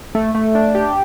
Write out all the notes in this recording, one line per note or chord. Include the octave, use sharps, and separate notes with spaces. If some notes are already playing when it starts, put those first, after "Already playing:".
A3
A3
D4
G4